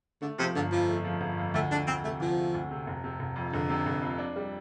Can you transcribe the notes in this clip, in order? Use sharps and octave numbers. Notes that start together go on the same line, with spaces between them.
D3 A3
C3 F3
G1 D3
F2 F3
A3
F3
G1
F2
D2 A3
A3 D4
D2 C4
C3 A3
D2 F3
A3
D2
C3
F1
C3
F1
F2
F1 D3
C3
F1
F2
D4
G3